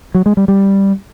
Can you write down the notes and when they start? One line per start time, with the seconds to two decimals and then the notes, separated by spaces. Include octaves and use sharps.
0.15 F#3
0.26 G#3
0.37 G3
0.48 G3